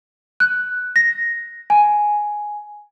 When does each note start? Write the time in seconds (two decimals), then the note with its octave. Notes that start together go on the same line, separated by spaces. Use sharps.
0.40 F#6
0.96 A#6
1.70 G#5